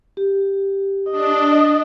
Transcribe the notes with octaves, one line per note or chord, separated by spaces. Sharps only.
G4
D4 D#5